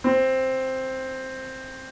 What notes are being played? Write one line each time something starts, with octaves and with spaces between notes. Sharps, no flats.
C4